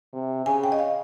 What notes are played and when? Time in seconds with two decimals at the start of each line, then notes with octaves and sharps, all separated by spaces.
0.13 C3
0.46 C#3 G#5
0.64 G5
0.72 D#5
0.79 F5